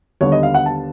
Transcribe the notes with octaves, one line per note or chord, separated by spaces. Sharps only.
D#2 D3 G3 B3 C#5
D#5
F5
F#5
A5